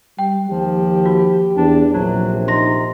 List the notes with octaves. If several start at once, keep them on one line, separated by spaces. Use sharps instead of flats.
G3 G5
D#2 F3 G4
F#4
E2 D4
A#1 C3 F#3
D#4 C6 A#6